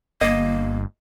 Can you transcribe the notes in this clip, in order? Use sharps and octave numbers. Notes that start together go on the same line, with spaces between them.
G1 A#3 D#5